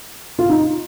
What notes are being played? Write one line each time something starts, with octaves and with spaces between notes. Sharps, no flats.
F4
D#4